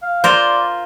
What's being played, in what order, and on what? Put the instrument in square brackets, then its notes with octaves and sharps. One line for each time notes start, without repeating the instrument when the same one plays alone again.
[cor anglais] F5
[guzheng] F4 A#4 C5 [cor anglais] D5